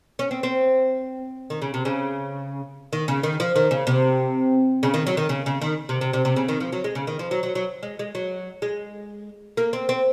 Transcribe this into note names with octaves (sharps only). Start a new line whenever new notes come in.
C#4
C4
C4
D#3
C#3
C3
C#3
D#3
C#3
D#3
F3
D#3
C#3
C3
C#3
D#3
F#3
D#3
C#3
C#3
D#3
C3
C3
C3
C3
C#3
D#3
F3
F#3
G#3
C#3
D#3
F3
F#3
F#3
F#3
G#3
G#3
F#3
G#3
A#3
C4
C4